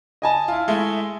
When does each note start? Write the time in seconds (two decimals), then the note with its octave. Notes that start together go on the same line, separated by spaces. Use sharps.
0.22 D#5 G#5 A5
0.48 E4 F4
0.68 G#3 A3 E4